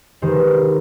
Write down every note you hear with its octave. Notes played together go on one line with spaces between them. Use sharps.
D#3 G#3 D#4 G4 B4 C5